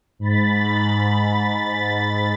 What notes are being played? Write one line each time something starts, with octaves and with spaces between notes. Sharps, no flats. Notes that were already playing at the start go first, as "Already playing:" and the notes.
G#2 B5 A6